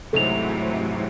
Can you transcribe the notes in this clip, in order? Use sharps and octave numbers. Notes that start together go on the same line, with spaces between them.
G#2 C3 E3 F#3 A3 A4 F7